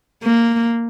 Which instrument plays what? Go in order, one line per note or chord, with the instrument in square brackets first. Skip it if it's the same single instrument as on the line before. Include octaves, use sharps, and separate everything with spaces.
[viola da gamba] A#3